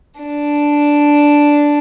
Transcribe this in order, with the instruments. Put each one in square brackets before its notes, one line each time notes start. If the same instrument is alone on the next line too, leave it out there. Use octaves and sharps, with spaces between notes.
[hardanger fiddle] D4